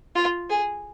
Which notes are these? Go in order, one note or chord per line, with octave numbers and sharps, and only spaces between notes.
F4
G#4